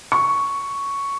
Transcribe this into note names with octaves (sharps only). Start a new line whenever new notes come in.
C#6